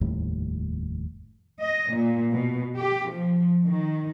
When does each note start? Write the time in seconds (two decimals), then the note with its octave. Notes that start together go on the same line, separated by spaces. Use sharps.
0.01 F1 D#2 A2 G3
1.60 D#5
1.94 A#2
2.32 B2
2.76 G4
3.10 F3
3.65 D#3